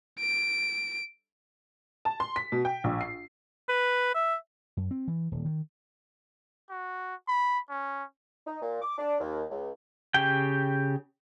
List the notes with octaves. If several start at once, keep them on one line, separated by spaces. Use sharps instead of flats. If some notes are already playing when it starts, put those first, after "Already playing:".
D7
A5
C6
B6
B2
G5
A#1
C7
B4
E5
F#2
C4
E3
D#1
D#3
F#4
B5
C#4
D#4
A#2
D6
D4
D#2
C#2
C#3 G4 G5